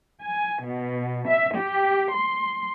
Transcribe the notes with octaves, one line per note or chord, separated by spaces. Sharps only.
G#5
B2
E5
G4
C6